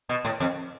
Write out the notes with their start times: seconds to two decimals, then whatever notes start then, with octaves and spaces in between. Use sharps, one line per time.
0.09 B2
0.25 A2
0.40 F2